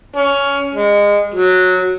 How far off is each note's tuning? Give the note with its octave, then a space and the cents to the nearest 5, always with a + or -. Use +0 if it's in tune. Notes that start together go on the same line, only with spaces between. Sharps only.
C#4 +15
G#3 -25
F#3 -10